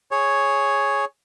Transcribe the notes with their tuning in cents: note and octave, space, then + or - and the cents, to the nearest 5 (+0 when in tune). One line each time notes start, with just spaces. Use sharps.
G#4 +5 C#5 +0